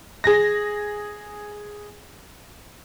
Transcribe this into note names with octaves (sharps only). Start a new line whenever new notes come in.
G#4 A#6